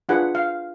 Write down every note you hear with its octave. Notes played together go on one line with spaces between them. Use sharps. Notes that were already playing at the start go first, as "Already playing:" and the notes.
D4 F4 G#4 B4 F#5
F5